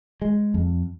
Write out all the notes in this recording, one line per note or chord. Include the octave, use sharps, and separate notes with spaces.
G#3
F2